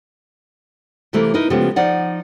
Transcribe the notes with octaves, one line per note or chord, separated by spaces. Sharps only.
C3 E3 A3 A#3 G4
D#4 E4 A#4 B4
C#3 F3 G#3 A3 B3 G4
F3 D#4 D5 F#5